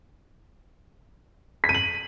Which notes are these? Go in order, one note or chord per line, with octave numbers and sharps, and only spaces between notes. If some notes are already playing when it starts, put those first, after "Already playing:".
B6
D#7
F#7